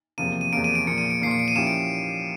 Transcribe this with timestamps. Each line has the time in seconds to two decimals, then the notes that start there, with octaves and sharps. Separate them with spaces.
0.18 E2 C3 F3 A#3 D#7
0.41 D#7
0.53 E2 C3 F3 A#3 D7
0.64 D#7
0.75 D7
0.87 A#2 F3 A#3 C#7
0.98 D#7
1.10 D7
1.21 A#2 F3 A#3 C7
1.31 C#7
1.39 D7
1.48 D#7
1.55 F3 A#3 C#4 E4 G4 E7
1.67 D7